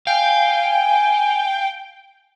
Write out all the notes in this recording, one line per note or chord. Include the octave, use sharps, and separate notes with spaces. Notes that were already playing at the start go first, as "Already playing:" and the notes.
F5 G5 G#5